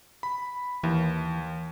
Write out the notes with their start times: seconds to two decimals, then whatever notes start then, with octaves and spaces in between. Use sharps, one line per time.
0.23 B5
0.83 D#2 E3